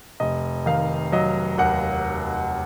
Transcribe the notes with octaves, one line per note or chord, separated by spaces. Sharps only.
F1 D#5
D#3 F5
F#3 D#5
D#2 F#5